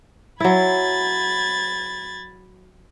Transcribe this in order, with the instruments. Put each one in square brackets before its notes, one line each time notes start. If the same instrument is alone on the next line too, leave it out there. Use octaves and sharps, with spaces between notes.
[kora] F#3 E4 [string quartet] B5 G#6 A6